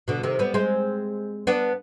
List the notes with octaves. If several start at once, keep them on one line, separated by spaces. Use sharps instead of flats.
B2 D3
C3 D#3
G3 B3
G#3 C4
B3 D4